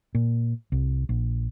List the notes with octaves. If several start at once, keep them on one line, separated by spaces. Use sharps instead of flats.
A#2
C2
A#1